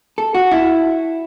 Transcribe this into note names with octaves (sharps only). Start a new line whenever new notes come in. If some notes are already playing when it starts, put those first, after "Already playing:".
A4
F#4
E4